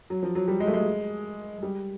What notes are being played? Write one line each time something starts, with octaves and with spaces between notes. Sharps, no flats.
F#3
F3
F#3
G3
G#3
A3
G#3
G#3
G3